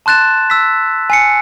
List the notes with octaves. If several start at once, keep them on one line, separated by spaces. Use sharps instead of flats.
A5 C6 F#6 A6 E7
E6 B6
G#5 C7 C#7